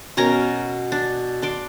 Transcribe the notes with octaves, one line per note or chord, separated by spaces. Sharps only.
B2 C#4 A#4 A#5
D4
D4 C6 D6